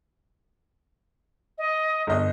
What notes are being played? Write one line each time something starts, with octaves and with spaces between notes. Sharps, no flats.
D#5
G1 D#5